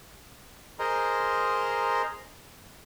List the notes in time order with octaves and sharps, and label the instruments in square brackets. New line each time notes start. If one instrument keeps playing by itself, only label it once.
[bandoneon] G#4 A#4 C5 D#5 A#5 C6